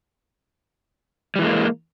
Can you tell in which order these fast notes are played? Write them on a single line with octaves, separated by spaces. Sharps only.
G3 E3 G#3 A#3